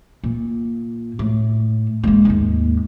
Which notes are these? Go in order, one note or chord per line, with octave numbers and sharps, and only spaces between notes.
A#2
A2
G#3 A#3
D#2 G#2